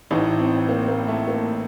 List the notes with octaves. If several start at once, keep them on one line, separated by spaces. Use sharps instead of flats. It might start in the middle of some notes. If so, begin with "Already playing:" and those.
A1 A2 D#4
C4
A#3
A#3
A3
A#3